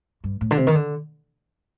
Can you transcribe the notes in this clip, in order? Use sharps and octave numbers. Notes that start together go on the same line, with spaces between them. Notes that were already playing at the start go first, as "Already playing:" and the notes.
G2
A2
D3
C3
D#3
D3